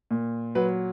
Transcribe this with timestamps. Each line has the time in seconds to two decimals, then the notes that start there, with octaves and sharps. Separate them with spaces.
0.11 A#2
0.55 F#3 B4